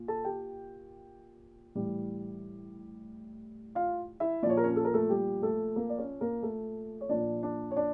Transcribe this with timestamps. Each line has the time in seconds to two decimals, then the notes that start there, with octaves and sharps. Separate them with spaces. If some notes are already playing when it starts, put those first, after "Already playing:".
Already playing: A#2
0.08 A4 A5
0.25 G4 G5
1.75 A2 E3 G3
3.75 F4 F5
4.20 E4 E5
4.43 A#2 D5
4.46 F3 C#5
4.57 A#4
4.64 C#4 C#5
4.76 A4
4.85 A#4
4.94 A3 A4
5.09 G3 G4
5.42 A3 A4
5.76 A#3 A#4
5.90 D5
5.98 C#4 C#5
6.21 A#3 A#4
6.42 A3 A4
7.01 C#5
7.09 A#2 F3 D4 D5
7.43 D4 D5
7.71 C#5
7.76 D4 D5